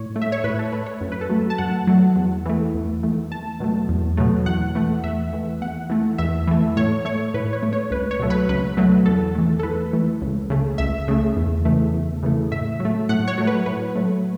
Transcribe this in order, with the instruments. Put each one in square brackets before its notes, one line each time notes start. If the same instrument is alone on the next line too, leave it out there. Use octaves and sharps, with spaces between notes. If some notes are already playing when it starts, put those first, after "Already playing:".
Already playing: [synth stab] A2 C#5
A3
E5
C#5
A2 B4
A4
A3 B4
C#5
F#2
B4
A4
F#3 A3
A5
F#2 F#5
F#3 A3
E2
E3 A3
E2
E3 A3
E2 A5
B2 F#3 A3
E2
B2 F#3 A3
E2 F#5
E3 A3
E2 E5
E3 A3
E2 F#5
E3 A3
E2 E5
E3 A3
A2 C#5
A3 C#5
A2 B4
C#5
A3
C#5
C#2 B4
C#5
B2 F#3 A3
B4
C#2 B4
B2 F#3 A3
E2 A4
E3 A3
A4
E2 B4
E3 A3
C#2
C#3 A3
C#2 E5
C#3 A3
E2
C#3 E3 A3
E2
C#3 E3 A3
A2 E5
F#3
A3
A2 F#5
C#5
F#3 A3
B4
A2 B4
F#3 A3